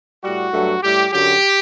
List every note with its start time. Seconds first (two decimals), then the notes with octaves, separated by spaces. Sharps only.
0.23 A2 G3 F#4
0.52 G2 F#3 A3
0.82 A2 G3 G4
1.10 F#2 D3 F#3 G4